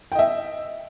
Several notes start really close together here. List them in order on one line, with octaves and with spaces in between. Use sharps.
G5 D#5 E5